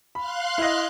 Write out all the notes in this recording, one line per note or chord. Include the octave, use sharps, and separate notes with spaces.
F5 B5 C6 F#6
E4 D#5